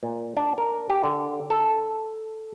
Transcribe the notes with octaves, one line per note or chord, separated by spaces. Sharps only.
A#2
D4
A#4
G4
D3
A4